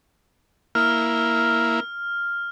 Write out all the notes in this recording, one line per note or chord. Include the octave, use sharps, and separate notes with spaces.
A#3 E4 F6